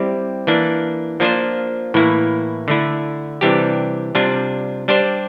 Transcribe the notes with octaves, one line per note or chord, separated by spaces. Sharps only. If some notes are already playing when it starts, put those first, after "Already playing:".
Already playing: G3 C4 E4 G4
E3 A#3 D4
F3 A#3 D4 F4 C5
A2 E3 A#3 E4
D3 A3 E4
C3 E3 G3 D4 G4
C3 G3 D4 F4
G3 D4 G4 C5